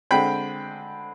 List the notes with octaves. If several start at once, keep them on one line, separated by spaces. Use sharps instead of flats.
D3 G#3 C4 G5 B5